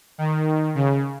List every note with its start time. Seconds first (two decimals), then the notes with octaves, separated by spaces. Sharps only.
0.18 D#3
0.75 C#3